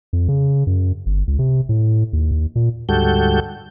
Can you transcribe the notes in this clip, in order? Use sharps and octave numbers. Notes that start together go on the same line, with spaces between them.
F2
C#3
F#2
G1
C#2
C3
A2
D#2
D#2
A#2
D2 G#2 G3 F#4 A4 G6